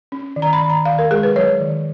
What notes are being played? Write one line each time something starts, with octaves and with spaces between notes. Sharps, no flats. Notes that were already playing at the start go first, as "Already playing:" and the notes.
C#4
D#3
A#5
B5
D#3
A#5
D#3 F5
A#4
G#3 G#4
B4
F#3 C#5
D#3